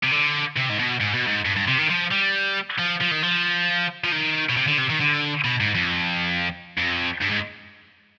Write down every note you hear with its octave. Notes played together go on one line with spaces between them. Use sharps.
C3
D3
C3
G#2
B2
G#2
B2
G#2
G2
G2
C3
D#3
F3
G3
F3
F3
D#3
F3
F3
D#3
B2
C3
D3
C3
D#3
D3
B2
G#2
F2
F2
G2
G#2